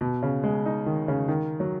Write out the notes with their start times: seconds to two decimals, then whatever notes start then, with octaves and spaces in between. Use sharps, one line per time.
0.01 B2
0.23 C#3
0.44 G#3
0.66 D#4
0.86 D#3
1.08 C#3
1.28 D#3
1.60 F#3